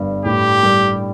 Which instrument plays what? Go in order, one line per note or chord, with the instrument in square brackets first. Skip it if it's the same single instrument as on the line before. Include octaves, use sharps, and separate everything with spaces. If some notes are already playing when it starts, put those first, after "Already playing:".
Already playing: [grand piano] G1 G2 B3
[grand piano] A2 [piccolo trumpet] G4
[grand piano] G3